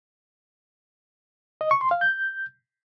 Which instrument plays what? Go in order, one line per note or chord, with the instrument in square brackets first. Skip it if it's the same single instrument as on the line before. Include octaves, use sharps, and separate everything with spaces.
[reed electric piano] D#5
C#6
C6
F5
G6